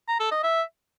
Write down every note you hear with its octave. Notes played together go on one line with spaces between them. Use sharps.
A#5
A4
D#5
E5